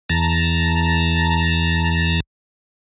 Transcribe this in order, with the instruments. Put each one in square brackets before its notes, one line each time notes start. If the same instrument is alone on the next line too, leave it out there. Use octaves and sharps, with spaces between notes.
[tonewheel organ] E2 A5 A#5